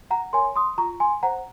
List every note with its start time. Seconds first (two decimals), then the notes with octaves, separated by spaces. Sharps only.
0.11 F#5 A#5
0.33 A#4 C#5 G#5 C6
0.56 C6 D#6
0.78 F4 A#5 C#6
1.00 G#5 C6
1.23 C5 F#5 A#5